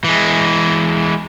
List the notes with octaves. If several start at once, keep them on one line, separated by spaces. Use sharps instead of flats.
E3 G#3